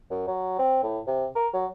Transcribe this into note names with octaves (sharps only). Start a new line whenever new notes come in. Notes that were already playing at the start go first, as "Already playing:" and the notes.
F#2
F#3
C4
A2
C3
A#4
F#3